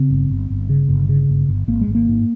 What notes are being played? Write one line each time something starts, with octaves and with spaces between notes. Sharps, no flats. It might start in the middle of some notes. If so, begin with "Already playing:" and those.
Already playing: C#3 C4
G1
G1
G1
C#3
G1
C#3
G1
G1
G#1 A#3
G#3
G#1
A#3
G#2